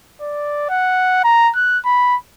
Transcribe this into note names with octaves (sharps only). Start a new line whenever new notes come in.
D5
F#5
A#5
F#6
B5